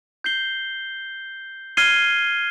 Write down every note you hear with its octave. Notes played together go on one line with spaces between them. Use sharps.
G6 C7 G7
F6 G#6 C7 D#7 G7